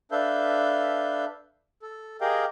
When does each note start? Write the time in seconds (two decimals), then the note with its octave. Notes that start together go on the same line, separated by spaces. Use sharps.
0.11 D4 A4 B4 E5 F5 G6
1.82 A4
2.21 G4 G#4 A#4 D#5 F5 G5